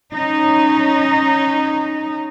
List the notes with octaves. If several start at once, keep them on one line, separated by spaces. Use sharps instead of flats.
C#4 D#4